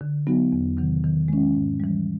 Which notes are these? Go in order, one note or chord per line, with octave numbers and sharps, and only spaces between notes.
D3
F#3 B3 D#4 F#4
E2
C3 D#3 F#3
D#3
G#3 C#4
G#2
E3 G3